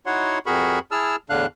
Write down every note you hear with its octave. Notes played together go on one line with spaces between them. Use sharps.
D#4 E4 F#4 C#5 F#5 C6
F2 F#4 G#4 A#4 B5 C#6
E4 G#4 A5 E6 F6
E2 A2 D3 D4 F5 F#6